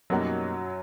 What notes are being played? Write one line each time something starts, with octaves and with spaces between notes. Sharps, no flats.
F#2 B2 F#3 G3 A#3 D#4 F#4